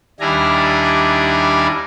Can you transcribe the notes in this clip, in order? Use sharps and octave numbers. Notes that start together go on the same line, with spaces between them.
D#2 G3 D4 E4 G#5 A#5